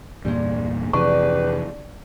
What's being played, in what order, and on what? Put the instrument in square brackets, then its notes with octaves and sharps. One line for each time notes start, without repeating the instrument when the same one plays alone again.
[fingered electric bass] E2 G2 A#2 [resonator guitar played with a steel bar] G3 G#3
[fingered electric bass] F2 C3 E3 [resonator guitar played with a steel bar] D4 [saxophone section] G4 G#4 B4 [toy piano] C#6